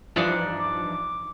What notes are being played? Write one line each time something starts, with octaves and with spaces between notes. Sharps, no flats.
G2 E3 F3 D4 D#4 D5
D6